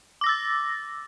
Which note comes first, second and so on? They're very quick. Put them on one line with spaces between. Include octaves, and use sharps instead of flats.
D6 A#6 E6 A6